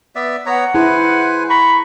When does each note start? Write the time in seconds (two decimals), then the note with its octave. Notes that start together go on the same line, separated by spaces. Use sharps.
0.15 B3 D5 E5
0.46 B3 C#5 F#5 A#5
0.75 E4 G#4 B4 C5 G#5
1.50 A#5 B5 C#6